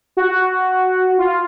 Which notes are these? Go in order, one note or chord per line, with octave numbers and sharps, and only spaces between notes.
F#4
F4